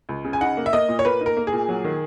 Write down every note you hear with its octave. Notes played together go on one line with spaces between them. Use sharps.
C#2
C#3
G#5
D#4 F#5
A#3
E5
A#3 D#5
A#2
C#5
A#3 B4
D#4
A#4
A#3
G#4
A#2
F#3
D#3